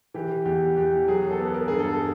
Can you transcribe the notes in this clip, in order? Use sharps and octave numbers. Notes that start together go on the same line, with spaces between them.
E3 G4
E2 G4
E2 G4
F#3 G#4
A4
B3
A#4
G2 G#4
A4